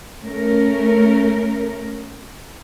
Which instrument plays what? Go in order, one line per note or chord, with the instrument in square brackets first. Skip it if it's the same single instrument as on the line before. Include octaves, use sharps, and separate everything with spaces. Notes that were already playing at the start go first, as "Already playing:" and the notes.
[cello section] A3 C#4 A#4